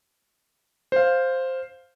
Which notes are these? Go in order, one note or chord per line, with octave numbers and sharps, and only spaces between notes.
C5 F5